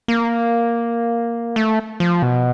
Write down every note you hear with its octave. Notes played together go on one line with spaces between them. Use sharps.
A#3
A3
F3
B2